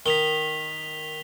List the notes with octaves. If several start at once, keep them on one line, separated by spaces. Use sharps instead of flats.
D#3 B6 F7 G7